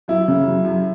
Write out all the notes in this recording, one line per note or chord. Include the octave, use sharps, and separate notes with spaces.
F#2 E4
C#3
F#2
F#2